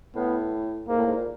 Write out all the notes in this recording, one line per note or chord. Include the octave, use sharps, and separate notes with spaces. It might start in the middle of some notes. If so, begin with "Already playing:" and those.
A2 B3
G#2 A#3
A2
G#2
A#2